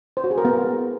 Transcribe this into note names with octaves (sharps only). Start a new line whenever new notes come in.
C5
F#4
G#4
A#4
B3